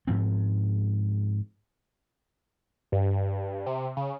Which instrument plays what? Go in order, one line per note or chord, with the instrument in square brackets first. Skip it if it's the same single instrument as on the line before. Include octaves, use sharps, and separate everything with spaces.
[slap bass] G#2 F3 C4
[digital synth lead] G2
C3
C#3